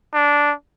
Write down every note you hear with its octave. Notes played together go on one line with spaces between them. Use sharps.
D4